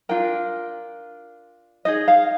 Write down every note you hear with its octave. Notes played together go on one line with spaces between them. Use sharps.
D4 F4 A#4 G5
D#4 G#4 D#5
F5